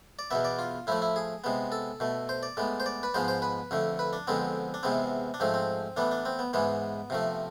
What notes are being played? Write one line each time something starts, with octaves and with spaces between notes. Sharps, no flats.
D5
E2 B2 B3 E5
D5
F4
A2 F3 A3 E4
E4
G#4
C3 G#3 B3
A4
B2 A3
C5
D5
A2 G#3 B3
C5
D5
B4
G#2 F3 G#3 B3 C5
C5
B4
F2 D3 A3
B4
D4
F2 D3 G#3 B3 C4
D4
E2 C3 G#3 B3 C4
D4
G#2 F3 A3 C4
C4
A2 E3 B3 D4
D4
C4
B3
G#2 E3 G#3 B3
C3 F3 A3